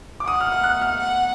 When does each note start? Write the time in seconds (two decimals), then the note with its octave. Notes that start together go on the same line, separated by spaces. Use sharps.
0.20 D6
0.27 F#5 D#6
0.41 F6
0.52 F6
0.64 F#6
0.82 F6
1.00 F#5